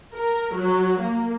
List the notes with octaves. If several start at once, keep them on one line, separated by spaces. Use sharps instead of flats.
A#4
F#3
A#3